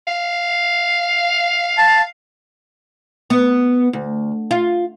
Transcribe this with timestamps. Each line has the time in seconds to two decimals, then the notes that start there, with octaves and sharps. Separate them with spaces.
0.08 F5
1.78 A5
3.30 B3
3.93 D2
4.51 F4